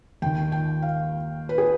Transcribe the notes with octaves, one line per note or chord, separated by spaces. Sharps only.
D#2 D#3 G5
G5
F5
B4
G#4